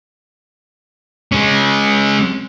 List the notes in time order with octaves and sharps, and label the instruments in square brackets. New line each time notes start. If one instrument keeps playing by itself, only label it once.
[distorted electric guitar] G#3 C#4